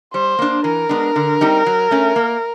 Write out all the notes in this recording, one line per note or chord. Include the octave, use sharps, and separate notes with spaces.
G3 C5
A#3 D4
E3 A#4
G#3 B3 D4
D3
G3 C4 D#4 G4
F#3
A3 C#4
A#3